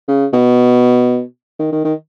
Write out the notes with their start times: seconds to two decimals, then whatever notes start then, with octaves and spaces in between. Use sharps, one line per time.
0.08 C#3
0.33 B2
1.59 D#3
1.72 D#3
1.85 D#3